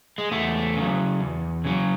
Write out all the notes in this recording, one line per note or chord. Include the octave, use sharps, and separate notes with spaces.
G#3
E2 A3
C#3 F#3
E2
C#3 F#3